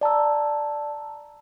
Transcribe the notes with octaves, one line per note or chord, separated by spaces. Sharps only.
D5 A5 A#5 E6